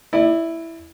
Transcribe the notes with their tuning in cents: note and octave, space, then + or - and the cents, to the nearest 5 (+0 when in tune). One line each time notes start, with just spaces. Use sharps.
E4 +0 D5 +35